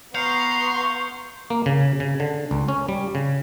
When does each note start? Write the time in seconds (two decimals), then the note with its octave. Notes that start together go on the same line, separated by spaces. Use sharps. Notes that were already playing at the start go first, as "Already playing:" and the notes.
0.15 B3 F5 A#5 C6 C#6 G6 C7 C#7
1.50 A#3
1.66 C#3
2.00 C#3
2.20 D3
2.51 C#2
2.68 C#4
2.89 G3
3.15 C#3